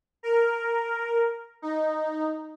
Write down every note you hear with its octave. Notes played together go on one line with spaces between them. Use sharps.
A#4
D#4